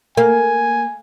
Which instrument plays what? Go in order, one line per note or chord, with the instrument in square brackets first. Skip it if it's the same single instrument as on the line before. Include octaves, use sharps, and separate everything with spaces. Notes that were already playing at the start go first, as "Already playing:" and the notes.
[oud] A#3 [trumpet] G#5